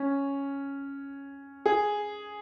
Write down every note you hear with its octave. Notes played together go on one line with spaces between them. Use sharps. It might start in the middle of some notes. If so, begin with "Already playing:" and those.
Already playing: C#4
G#4